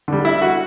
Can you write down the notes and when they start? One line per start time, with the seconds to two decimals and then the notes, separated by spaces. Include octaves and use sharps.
0.08 D3 G3
0.25 E4
0.42 F#4